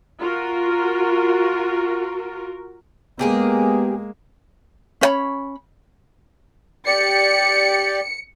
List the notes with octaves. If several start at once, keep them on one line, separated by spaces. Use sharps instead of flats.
F4 F#4 A#4
G#3 A#3 B3 G4 G#4 A#4
C#4 C5 C#5 B5
G4 D5 C#7